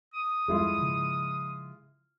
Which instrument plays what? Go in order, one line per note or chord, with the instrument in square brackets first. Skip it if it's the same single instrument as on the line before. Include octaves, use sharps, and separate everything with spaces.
[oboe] D#6
[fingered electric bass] F2 F3 G3 [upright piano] G#3 E4 F4
[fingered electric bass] C#3 F3